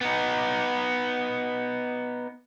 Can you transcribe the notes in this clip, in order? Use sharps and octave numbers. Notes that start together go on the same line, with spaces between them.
B3 D#4